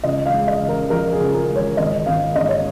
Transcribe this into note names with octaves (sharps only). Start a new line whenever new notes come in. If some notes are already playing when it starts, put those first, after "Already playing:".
C#2 D#5
F5
G#3
D#5
C#3
A#4
F3 A#4
G#4
C#2
A#4
G#3
C#5
G#1 D#5
G#1 F5
G#2 D#5
C#5